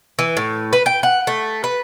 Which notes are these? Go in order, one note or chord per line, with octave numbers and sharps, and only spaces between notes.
E3
A2
B4
G5
F#5
A3
B4